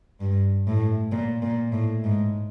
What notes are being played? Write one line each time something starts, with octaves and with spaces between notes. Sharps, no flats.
G2
A2
A#2
A#2
A2
G#2